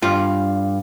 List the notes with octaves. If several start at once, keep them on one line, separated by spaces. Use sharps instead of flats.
G2 F4